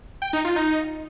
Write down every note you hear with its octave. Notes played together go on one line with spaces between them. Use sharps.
G5
D#4
F4
D#4